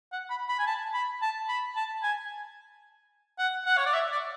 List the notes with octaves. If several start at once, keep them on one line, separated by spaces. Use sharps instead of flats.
F#5
B5
B5
G#5
A5
B5
A5
B5
A5
G#5
F#5
F#5
C#5
D5
E5
D5